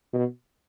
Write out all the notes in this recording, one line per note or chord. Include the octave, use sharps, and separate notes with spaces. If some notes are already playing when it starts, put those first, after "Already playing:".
B2